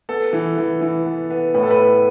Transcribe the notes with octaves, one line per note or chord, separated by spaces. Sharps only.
B3 A4
E3
E3
E3
B3
B3
A2 B4
A4
B4
B3